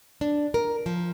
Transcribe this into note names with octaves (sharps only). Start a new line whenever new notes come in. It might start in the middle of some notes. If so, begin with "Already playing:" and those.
D4
A#4
F3